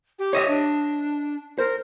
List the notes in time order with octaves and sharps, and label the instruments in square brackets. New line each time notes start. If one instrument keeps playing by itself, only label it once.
[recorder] G4
[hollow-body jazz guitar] C#5 D#5 E5
[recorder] D4
[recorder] A#4 [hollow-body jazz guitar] C5